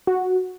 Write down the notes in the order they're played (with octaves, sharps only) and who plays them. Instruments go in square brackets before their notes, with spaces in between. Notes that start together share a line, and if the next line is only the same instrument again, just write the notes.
[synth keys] F#4